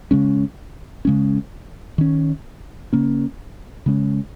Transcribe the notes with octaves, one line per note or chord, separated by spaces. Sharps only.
C#3 G#3 C#4
C#3 G#3 C#4
D#3 C#4
C#3 A#3 C#4
C#3 G#3 C#4